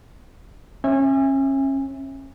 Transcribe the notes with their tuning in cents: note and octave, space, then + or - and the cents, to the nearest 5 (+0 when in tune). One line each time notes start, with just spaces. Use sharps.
C#4 -35 E5 +0 G#5 -25